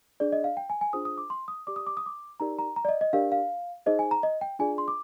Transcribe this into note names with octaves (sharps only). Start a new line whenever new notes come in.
D4 G#4 D5
D#5
F5
G5
G#5
G#5
D4 F4 G#4 C5 D#6
D#6
D6
C6
D#6
G4 D5 D6
D#6
D6
D#6
D6
D#4 G4 A#4 D5 A#5
A#5
A#5
D5
D#5
D#5
D4 G4 A#4 D5 F5
F5
D#4 G#4 C5 D#5
G#5
A#5
D#5
G5
D4 F4 G#4 D5 G#5
C6
D6